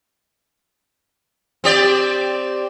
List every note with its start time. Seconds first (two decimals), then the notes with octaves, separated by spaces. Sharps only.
1.64 C4 G4 D5